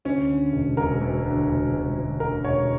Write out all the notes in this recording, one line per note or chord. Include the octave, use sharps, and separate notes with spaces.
D2 C#4
D3
E1
E1 A#4
D2
D3
E1
E1
D2
D3 A#4
E1 C#5